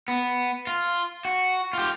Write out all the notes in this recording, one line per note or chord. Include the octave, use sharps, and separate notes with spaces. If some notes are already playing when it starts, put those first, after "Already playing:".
B3
F4
F#4
F4 G4